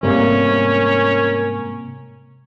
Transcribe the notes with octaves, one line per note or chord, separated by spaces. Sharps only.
G#2 C3 G3 A3 A#3 C#4 A#4